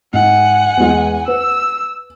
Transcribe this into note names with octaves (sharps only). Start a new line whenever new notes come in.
G#2 F#5 G#5
E2 G#3
B4 E6